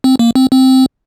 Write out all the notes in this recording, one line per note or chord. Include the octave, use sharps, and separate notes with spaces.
C4
A#3
C4
C4